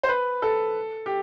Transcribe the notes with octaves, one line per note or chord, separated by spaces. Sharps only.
C5
B4
A4
G4